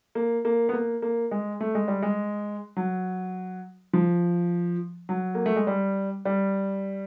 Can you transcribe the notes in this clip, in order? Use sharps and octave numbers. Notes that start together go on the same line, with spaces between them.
A#3
A#3
B3
A#3
A#3
G#3
A3
G#3
G3
G#3
F#3
F3
F#3
A#3
A3
G#3
G3
G3